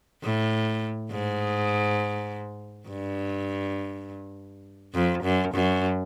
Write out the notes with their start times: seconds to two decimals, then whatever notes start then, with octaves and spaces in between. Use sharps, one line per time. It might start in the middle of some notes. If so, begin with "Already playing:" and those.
0.23 A2
1.11 G#2
2.88 G2
4.94 F2
5.23 F#2
5.53 F#2